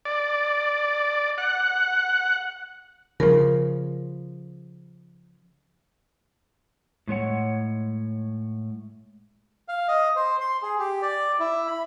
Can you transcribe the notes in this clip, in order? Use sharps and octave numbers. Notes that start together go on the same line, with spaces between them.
D5
F#5
C#3 F3 A#4
A2 G#3 C#5 F#5
F5
D#5
C5
C6
G#4
G4
D5
E4
B5